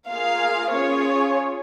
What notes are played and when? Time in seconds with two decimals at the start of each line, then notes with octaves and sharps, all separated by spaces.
0.08 A#3 F4 G#4 F5
0.71 C#4 F4 G#4 C#5